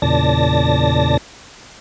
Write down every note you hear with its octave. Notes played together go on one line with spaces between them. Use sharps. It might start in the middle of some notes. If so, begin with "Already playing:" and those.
E2 A#2 C#3 D5 A5 A#6